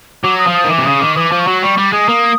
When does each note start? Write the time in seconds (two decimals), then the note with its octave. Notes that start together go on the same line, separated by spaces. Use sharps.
0.23 F#3 D6
0.39 D#6
0.47 F3
0.54 D#6
0.64 D#3
0.70 E3 D6
0.79 C3
0.85 C#3 D#6
1.00 D#3 D6
1.16 E3 D6 D#6
1.32 F3
1.40 C#6
1.47 F#3
1.62 G3 C#6
1.77 G3 D6
1.93 G#3 D#6
2.09 A#3